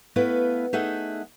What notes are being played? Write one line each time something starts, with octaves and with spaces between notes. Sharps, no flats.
A3 B3 E4 B4 F5
A3 D#4 G#4 E5 F#5